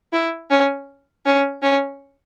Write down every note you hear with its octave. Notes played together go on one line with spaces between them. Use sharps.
E4
C#4
C#4
C#4